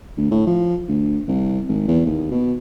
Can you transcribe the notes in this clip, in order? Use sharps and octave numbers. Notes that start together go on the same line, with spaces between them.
D2
A2
F3
D2
C2
G#1
E2
D#2
B2